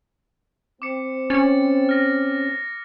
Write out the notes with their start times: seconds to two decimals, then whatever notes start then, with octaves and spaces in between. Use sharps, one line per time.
0.82 C4 D6 C#7
1.30 C#4 A6 C#7
1.89 F6 A#6